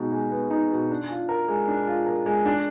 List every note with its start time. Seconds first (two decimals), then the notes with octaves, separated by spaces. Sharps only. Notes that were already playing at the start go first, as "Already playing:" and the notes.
Already playing: B2 G#3 B3 D#4
0.12 G#3
0.32 B3
0.50 D#4
0.71 B2
0.90 D4
1.10 F4
1.29 A#4
1.48 G#3
1.68 D4
1.87 F4
2.06 A#4
2.26 G#3
2.45 D4